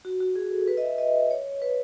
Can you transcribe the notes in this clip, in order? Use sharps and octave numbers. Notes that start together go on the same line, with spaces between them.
F#4
F#4
G#4
A4
B4
D#5
E5
D#5
C#5
B4